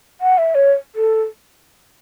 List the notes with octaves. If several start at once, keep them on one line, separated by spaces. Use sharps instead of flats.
F#5
E5
C#5
A4